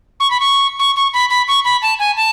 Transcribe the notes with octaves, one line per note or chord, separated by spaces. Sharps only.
C#6
B5
C#6
C#6
C#6
B5
B5
C#6
B5
A5
G#5
A5